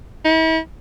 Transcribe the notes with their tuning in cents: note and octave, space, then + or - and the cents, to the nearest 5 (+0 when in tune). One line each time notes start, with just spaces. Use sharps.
E4 -40